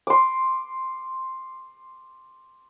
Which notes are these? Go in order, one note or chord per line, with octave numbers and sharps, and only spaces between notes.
C6 D6